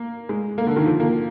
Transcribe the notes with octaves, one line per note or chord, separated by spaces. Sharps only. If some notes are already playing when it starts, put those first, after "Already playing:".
Already playing: A#3
G#3
A#3
D3
D#3
F3
A#3